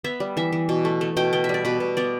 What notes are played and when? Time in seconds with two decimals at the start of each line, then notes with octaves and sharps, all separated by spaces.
0.04 B3 E5
0.20 G3
0.37 E3 E5
0.53 E3
0.69 B2
0.85 A3
1.01 A3
1.17 B2 G5
1.33 B3 G5
1.44 E5
1.49 G3 D5
1.65 B2 B4
1.80 B2
1.97 B3 D5